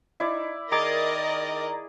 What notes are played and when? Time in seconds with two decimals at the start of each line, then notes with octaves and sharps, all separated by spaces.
0.20 D#4 E4 D5
0.72 D#3 G#4 A#4 D5 D#5 A#5 D6 A6